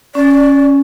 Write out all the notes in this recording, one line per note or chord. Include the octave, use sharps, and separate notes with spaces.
C#4 D5